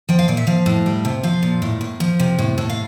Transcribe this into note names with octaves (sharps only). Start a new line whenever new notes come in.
F3 G5
F5
A#2 D5
E5
F3 F5
A2
G3
C3
F3 F5
A#2
A2
A2
F3
C3
A2
A2
F5